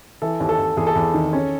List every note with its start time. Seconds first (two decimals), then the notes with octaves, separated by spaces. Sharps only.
0.22 E3 A4
0.40 D#2
0.49 A4
0.59 D#2
0.77 E2 G#4
0.87 A4
0.95 E2 G#4
1.14 D#3
1.33 C#4